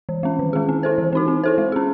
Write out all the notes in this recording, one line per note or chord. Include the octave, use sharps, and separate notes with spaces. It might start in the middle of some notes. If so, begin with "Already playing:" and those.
E3
G#3 C#4
D#3
G#3 C#4 G#4
C4
E4 A4 C5
E3
C4 D#4 F#4
C4
E4 A4 C5
G#3
C#4 G#4